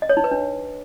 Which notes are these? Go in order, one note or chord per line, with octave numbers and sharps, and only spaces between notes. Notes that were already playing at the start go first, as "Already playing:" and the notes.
D#5
C#5
D#4
B4
D4